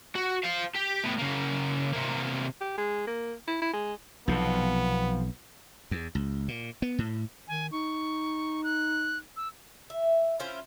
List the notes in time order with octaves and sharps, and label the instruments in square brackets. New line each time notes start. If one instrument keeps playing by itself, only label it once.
[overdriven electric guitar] F#4
C5 F5
G4
A2 B3
C#3 A#3
C3 A#3
[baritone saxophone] G4
G#3
A#3
E4
E4
G#3
[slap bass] B1 C3 [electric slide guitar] F3 A4 [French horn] B3
[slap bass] E2
C#2
A#2
B3
A2
[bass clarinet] D#3 [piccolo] G#5
[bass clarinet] D#4 [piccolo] C#6
[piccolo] F#6
E6
[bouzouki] E5
C#4 E4 F4 C5